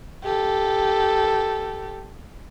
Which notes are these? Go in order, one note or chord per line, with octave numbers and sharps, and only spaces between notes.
G4 A4